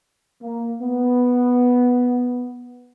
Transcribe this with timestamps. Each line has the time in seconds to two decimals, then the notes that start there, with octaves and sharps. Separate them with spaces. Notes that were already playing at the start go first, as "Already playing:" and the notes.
0.43 A#3
0.82 B3